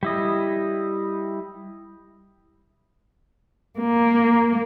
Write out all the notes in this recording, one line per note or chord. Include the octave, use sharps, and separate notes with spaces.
G3 E4 D#5
A#3